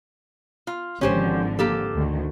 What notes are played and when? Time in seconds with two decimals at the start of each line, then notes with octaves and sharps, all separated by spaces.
0.67 F4
1.01 G#1 D3 F3 C#4 G4 C5
1.59 A#3 G4 A4
1.94 D2 D#3